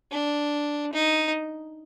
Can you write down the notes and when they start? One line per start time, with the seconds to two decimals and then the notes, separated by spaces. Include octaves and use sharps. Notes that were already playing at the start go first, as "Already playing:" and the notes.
0.12 D4
0.93 D#4